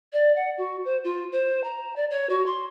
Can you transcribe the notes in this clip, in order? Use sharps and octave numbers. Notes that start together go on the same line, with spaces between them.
D5
F#5
F#4
C5
F4
C5
A#5
D5
C#5
F#4
C6